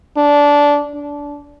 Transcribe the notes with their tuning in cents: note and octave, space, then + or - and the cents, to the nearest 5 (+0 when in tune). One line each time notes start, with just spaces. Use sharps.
D4 -15
D4 -20